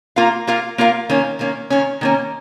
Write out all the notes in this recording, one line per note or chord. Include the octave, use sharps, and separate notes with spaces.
A#3 F4 A#4 F5
A#3 F4 A#4 F5
A#3 F4 A#4 F5
D#3 A#3 C#4
D#3 A#3 C#4
D#3 A#3 C#4
D#3 A#3 C#4